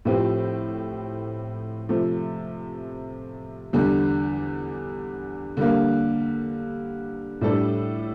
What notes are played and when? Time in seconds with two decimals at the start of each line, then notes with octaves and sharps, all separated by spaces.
0.05 A2 F3 C4 G4
1.89 C3 F3 A3
3.73 E2 D3 G3
5.57 D3 G3 A#3
7.41 A2 G3 D4 A4